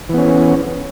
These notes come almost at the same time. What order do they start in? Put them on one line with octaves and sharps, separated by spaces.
E3 B3 C#4